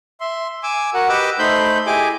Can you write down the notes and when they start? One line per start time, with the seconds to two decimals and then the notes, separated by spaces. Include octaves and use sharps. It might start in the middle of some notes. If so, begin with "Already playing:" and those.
0.20 E5 C6
0.63 G#5 D6 E6
0.94 F#4 A#4 F#5
1.09 G4 B4 D#5 D6 E6
1.39 A3 D#4 C5 B5 G6
1.87 E4 G4 G#4 D#5 G#5 D6